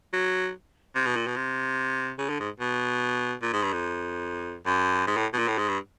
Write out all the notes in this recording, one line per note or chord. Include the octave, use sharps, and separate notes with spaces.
F#3
C3
B2
A#2
B2
C3
C#3
D3
G#2
B2
A#2
G#2
G2
F2
F#2
G#2
A2
B2
A#2
A2
G#2
G2